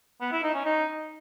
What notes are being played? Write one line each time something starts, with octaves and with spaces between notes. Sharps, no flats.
B3
E4
D#4
C#4
D#4